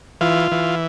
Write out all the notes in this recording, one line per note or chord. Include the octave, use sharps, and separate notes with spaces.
E3 F4
E3